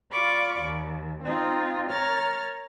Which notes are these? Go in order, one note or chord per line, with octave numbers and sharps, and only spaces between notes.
F4 D5 F5 B5 C#6 D6
D#2
C4 D#4 F4
A#4 C#5 A#5 F6 A6